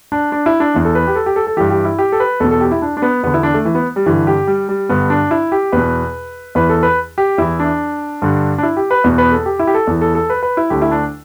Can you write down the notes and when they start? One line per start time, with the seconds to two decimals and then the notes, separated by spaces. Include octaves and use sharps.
0.12 D4
0.32 D4
0.46 E4
0.60 D4
0.74 E2 E3
0.85 A4
0.95 B4
1.07 G4
1.15 A4
1.26 G4
1.36 A4
1.47 A4
1.57 G2 E3 G4
1.70 G4
1.85 E4
1.99 G4
2.12 A4
2.20 B4
2.40 E2 A4
2.44 B2
2.51 A4
2.61 G4
2.72 E4
2.82 D4
2.97 D4
3.02 B3
3.23 E2 D3 B3
3.34 E4
3.43 D4
3.54 A3
3.65 E3
3.75 B3
3.96 G3
4.06 G2 D3 E3
4.27 G4
4.47 G3
4.69 G3
4.89 G2 D3 B3
5.10 D4
5.31 E4
5.52 G4
5.72 E2 B2 B4
6.55 E2 E3 B4
6.70 A4
6.83 B4
7.18 G4
7.38 E2 E3 E4
7.60 D4
8.22 G2 D3
8.58 D4
8.63 E4
8.77 G4
8.91 B4
9.04 E2 B2
9.18 B4
9.32 A4
9.46 G4
9.59 E4
9.67 G4
9.74 A4
9.87 E2 E3
10.01 A4
10.15 A4
10.30 B4
10.43 B4
10.57 E4
10.70 D2 D3 G4
10.82 E4
10.91 D4